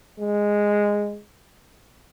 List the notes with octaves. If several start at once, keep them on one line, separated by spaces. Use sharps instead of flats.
G#3